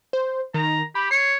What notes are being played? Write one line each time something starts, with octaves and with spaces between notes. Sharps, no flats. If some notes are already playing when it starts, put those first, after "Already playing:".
C5
D#3 A#5
G4 B5
C#5 C7